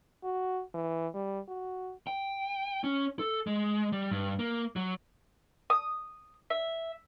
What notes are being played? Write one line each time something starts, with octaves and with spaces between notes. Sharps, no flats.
F#4
E3
G3
F#4
G5
C#4
A4
G#3
G3
G2
A#3
F#3
D#6
E5